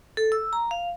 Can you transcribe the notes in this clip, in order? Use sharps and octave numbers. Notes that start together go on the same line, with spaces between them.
A4
E6
A#5
F5